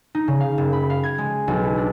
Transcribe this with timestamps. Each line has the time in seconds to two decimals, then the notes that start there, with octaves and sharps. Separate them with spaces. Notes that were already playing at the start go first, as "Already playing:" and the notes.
0.15 D#4
0.28 C#3
0.40 F5
0.58 F#1
0.73 B5
0.90 F5
1.04 G#6
1.18 G#3
1.48 B1
1.63 E4
1.77 D4